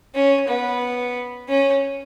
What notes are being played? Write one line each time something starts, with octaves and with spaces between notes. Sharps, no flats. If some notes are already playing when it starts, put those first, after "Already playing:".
C#4
B3
C#4